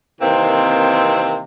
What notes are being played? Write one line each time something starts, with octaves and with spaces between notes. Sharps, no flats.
C3 D#3 E3 A#3 C4